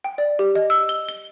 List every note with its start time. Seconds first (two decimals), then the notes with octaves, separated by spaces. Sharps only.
0.04 G5
0.18 D5
0.39 G4
0.55 D#5
0.70 E6
0.89 G7
1.09 G7